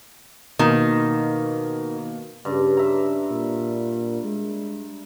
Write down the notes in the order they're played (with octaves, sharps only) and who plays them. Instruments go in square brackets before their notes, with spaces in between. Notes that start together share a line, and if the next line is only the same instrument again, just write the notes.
[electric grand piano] B2 A#3 [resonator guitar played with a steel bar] D#3
[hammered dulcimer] G2 [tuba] C#3
[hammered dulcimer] E5 A#5
[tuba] A#2
G#3